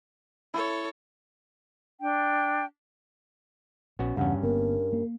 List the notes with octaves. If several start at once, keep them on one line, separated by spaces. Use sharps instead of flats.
E4 A4 C#5
D4 G5
A#1 B3 C#4 F#4
E2 G2 C#3 C#4 F#5
G1 A#3 B3 A#4
A#3